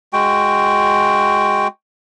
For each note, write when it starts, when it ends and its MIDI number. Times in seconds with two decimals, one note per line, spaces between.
0.13 1.68 56
0.13 1.68 66
0.13 1.68 79